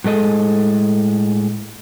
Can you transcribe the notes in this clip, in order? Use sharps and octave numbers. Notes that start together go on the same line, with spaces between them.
A2 G#3 A4 D#5